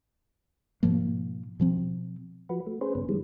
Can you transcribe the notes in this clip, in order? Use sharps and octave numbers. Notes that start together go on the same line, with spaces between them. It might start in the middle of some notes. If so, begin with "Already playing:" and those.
G#2 B2 F3 A#3
B2 F3 C4
F3 F#4 B4
A3
C#4 G#4 B4 C5
G2 C#3 B3
D#3 E3 G3 G#3